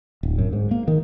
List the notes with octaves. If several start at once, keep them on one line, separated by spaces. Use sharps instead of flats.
D1
F#2
G#2
A#3
D#3